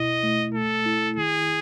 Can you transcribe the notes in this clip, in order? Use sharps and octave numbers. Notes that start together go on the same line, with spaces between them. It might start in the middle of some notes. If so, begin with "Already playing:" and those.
Already playing: B2 E4 D#5
A3
A3 A4
E4
D#3 G#4